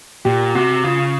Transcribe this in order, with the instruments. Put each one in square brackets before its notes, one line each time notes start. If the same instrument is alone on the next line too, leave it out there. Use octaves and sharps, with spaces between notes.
[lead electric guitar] A#2 [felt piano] G4
[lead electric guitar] C3 [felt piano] F#4
[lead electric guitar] C#3 [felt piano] F4